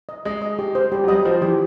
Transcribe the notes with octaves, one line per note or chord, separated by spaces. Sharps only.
D#5
G#3 D#5
D#5
G4
C5
G3 G4
F#3
G3 D#5
F3 C5
E3 G4